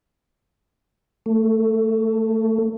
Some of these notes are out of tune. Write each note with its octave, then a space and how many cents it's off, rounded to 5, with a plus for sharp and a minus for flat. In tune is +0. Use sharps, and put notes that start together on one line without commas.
A3 +15